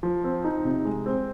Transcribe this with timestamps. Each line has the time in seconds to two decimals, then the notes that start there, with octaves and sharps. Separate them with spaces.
0.03 F3
0.24 C4
0.44 D#4
0.65 C3
0.85 G#3
1.06 C4